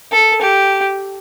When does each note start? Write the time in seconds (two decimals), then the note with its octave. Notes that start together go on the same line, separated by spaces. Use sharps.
0.12 A4
0.42 G4